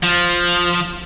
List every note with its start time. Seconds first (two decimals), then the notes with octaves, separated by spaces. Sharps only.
0.03 F3